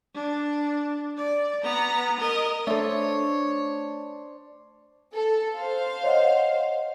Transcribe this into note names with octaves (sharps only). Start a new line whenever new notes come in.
D4
D5
B3 A#5
A#4 D#5
A3 D4 A4 C5 C#5 E5
A4
C5 F5
C#5 D#5 F#5